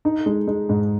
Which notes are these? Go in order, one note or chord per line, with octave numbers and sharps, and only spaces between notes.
D#4
G#3
G#3
G#2